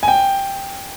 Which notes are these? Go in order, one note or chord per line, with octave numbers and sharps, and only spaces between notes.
G#5
G5